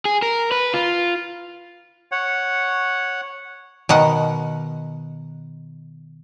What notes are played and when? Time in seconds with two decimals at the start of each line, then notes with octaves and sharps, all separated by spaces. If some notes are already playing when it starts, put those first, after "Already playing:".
0.05 G#4
0.22 A#4
0.52 B4
0.74 F4
2.12 C#5 F#5
3.89 B2 D#3 F#5